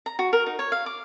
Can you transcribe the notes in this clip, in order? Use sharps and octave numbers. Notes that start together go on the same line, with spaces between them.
A#5
F#4
A#4
D#4
C#5
F5
D6